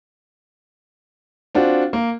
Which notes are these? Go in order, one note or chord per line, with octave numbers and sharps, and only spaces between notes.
C4 D4 F4 F#4
A#3